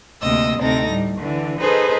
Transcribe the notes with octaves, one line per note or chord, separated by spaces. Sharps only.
D2 C3 A#3 D#5 E6
D2 C3 C4 D#4 A4 A#6
A2 G3
D3 E3
D#4 G#4 A4 B4 C5